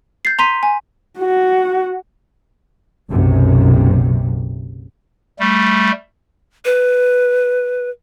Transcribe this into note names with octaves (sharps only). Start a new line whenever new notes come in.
G6 A6 C7
A#5 C6 B6 D#7
G#5
F#4
F#1 B1 F#2 C3
G3 A3
B4